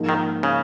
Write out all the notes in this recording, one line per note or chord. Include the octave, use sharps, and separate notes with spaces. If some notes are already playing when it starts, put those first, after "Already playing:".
Already playing: G#2 F3 A#3 D#4
D#3
C#3